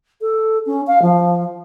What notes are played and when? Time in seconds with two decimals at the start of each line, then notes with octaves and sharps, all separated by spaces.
0.21 A4
0.66 C#4
0.87 F5
1.02 F3